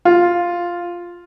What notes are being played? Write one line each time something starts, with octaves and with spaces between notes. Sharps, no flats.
F4